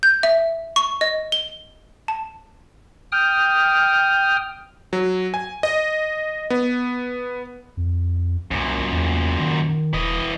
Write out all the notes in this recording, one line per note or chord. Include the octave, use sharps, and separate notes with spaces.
G6
E5
C#6
D#5
G7
A5
G5 D#6 F6
F#3
G#5
D#5
B3
F2
C2 F#2 A#2
E2
D#3
D#1 E3 D#5